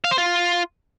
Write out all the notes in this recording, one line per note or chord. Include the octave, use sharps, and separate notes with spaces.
F5
C5
F4